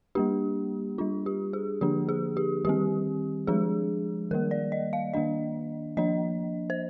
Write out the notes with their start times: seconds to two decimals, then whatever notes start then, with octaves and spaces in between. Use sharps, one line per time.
0.15 G3 A#3 D4 G4
0.98 G3 D4 F4
1.26 G4
1.53 G#4
1.81 D3 F3 A#3 D4 G4
2.09 G#4
2.37 G4
2.65 D#3 G3 C4 G4
3.47 F3 G#3 D4 G#4
4.31 D#3 G3 A#3 A#4
4.51 D5
4.72 D#5
4.93 F5
5.14 D#3 A#3 D4 D#5
5.97 F3 A#3 D4 D#5
6.70 C5